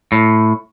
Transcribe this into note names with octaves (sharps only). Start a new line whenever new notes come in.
A2